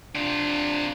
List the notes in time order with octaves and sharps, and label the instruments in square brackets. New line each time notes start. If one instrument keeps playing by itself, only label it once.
[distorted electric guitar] C3 F4 [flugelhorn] D4